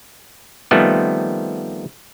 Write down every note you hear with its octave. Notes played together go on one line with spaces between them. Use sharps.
D#3 F3 G3 A3 B3 C4